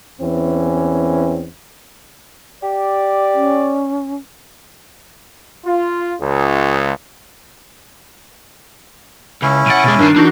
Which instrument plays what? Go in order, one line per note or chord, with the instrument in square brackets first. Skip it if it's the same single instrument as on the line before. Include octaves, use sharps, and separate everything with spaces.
[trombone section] E2 E3 C4 C#4
[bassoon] G4 [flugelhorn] D5
[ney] C#4
[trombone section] F4
C#2
[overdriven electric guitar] C#2 [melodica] C#4 E4
[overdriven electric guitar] B1 F#5 [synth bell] A6 D7 D#7
[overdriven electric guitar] B2 G#3
[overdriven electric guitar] G2 D#3 [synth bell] D4 A#4 C7
[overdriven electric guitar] E3 [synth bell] D4 D#4 F#4